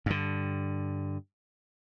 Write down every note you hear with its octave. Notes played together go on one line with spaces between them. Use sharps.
G2 D3